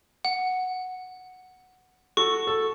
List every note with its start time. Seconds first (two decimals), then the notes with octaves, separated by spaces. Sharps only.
0.25 F#5
2.17 F#4 A4 C#6
2.47 A4